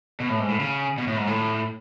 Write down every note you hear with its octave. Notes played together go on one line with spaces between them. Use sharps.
B2
A2
G#2
A2
C#3
B2
A2
G#2
A2